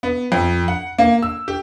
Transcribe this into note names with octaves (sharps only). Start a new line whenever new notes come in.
B3
F2
F#5
A#3
E6
G4